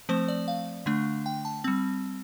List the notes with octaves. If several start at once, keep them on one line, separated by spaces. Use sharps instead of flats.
F3 A3 C4 C5
D5
F5
D3 A3 D4
G5
A5
G3 C4